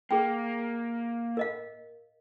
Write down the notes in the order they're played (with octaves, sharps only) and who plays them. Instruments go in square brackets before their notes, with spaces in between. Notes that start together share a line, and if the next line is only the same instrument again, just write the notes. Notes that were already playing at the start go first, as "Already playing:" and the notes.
[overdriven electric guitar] A#3 [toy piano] G#4 G5
[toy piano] A#4 D#5 F5